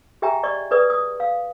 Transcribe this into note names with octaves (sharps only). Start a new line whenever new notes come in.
G4 G#4 E5 G5 G#5 A#5
D5 D#5 C#6
G#4 B4 D5 D#6
D#6
F5